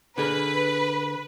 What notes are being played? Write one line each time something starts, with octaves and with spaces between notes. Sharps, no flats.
D3 G#4 A#4 B4